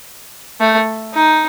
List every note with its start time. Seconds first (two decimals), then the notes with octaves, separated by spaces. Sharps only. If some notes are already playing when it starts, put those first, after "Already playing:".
0.60 A3
1.15 D#4